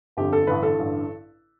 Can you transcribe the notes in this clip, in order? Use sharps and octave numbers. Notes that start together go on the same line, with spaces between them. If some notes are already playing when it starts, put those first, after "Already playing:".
G1 F2 D3 G4
A4
A1 G2 D3 B4
A4
A1 G2 D3